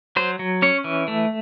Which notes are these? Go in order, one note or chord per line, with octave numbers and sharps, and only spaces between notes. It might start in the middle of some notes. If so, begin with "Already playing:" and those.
F#3 C5
F#3
C#4 C#5
E3
A3